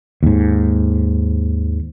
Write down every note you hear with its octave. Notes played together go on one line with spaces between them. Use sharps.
D#2 G#2